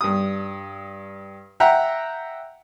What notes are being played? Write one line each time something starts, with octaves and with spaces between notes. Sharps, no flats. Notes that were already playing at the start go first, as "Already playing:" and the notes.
G2 D#6
E5 F#5 G5 A#5